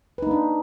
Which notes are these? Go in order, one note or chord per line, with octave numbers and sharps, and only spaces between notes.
A#3 D4 D#4 B4